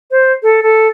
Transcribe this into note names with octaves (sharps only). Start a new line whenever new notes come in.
C5
A4
A4